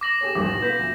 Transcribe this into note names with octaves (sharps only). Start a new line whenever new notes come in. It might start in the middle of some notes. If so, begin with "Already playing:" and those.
D6 A#6 F#7
G4 G#4 C#5
G#1 E2 G2 D6
B2 A6
B3 F4 G6 B6
D2